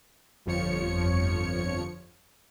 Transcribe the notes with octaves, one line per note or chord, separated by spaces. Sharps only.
G1 F2 F3 C#5 C#7